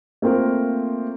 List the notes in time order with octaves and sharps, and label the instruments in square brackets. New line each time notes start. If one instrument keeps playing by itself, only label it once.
[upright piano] A3 A#3 C4 F4 A#4